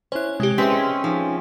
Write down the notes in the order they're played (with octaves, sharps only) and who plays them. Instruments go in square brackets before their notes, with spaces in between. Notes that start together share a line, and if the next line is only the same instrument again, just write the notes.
[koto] C#4 [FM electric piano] E4 C5 [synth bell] C#5 F#6
[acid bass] C3 [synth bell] G#3 G4
[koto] G#3 C4 [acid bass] C#4 [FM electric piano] G#4 B4 [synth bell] E5 B6
[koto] F3 [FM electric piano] D#4